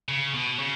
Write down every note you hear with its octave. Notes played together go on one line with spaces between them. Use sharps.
C#3
B2
C#3